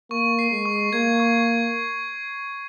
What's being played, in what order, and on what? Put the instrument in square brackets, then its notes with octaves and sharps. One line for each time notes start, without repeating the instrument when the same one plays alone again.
[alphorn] A#3 [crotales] C#6
[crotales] C7
[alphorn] G#3
[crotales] C#6
[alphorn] A#3 [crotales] G#6
[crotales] C#6